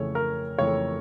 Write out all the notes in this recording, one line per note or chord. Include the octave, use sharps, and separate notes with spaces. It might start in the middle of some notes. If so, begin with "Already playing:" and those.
Already playing: F2 C#3 E3 A3 C#5
A#4
F2 C#3 E3 A3 C#5